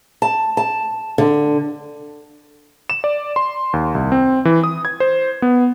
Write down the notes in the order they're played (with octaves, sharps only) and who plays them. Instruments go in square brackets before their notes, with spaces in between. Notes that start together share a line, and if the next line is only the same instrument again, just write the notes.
[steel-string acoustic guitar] A5
A5
D3
[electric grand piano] E7
D5
C6
D#2
C2
C4
E3
D#6
G#6
C5
B3